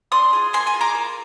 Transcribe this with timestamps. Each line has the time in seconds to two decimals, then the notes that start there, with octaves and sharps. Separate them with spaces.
0.12 D4 C6 D#6
0.33 F4 G#4
0.53 A#3 G#5 C6
0.67 G#5 C6
0.74 F4 G#4
0.81 A#5 D6
0.95 A#3